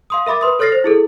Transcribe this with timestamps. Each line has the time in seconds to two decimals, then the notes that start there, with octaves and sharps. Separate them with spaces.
0.10 F5 C6 D#6
0.26 A#4 E5 B5 D6 A6
0.41 B4 C6 D#6
0.59 A4 C#5 F6 A6 A#6 C7
0.72 C5
0.84 E4 G#4 A4